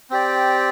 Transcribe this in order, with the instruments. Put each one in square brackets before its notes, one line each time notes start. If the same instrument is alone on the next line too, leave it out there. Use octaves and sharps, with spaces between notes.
[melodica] C4 G4 D5